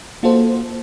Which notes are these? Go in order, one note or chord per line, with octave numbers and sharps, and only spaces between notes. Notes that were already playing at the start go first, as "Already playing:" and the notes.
A#3 F4 F#4 A4 C5